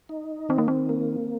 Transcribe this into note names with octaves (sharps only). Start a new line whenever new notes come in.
D#4
D#3 C4
A#3
C4
A#3